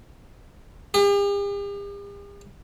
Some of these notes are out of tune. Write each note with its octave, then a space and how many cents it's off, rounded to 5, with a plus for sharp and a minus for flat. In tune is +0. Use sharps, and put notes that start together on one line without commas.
G4 +45